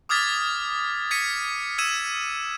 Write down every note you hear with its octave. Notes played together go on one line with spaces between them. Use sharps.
D6 D#6 F6 G#6 A6 B6
G#6 B6 C#7 D#7
E6 G#6 D#7 E7